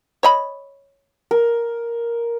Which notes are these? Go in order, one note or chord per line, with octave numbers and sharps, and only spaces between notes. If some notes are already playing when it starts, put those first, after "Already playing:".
C#5 D#5 B5
A#4